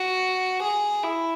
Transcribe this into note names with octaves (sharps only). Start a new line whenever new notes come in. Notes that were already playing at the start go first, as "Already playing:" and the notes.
Already playing: F#4
G#4
E4